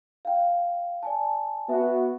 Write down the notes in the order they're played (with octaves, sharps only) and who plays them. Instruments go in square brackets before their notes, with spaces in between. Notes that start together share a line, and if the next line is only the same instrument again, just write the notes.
[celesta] F5 G5
D5 G#5 A5
[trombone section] B3 F#4 [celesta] E5